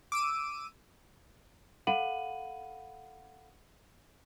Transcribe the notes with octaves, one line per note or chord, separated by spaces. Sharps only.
D6 E6 D7 D#7
A4 F5 F#5 B5 D#7 F#7